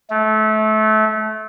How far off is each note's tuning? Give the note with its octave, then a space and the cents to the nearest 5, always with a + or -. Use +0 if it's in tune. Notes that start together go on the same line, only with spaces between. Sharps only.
A3 -25